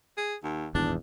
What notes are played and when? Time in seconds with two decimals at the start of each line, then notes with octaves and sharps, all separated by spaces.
0.17 G#4
0.44 D#2
0.75 D#1 G#1 E2 D4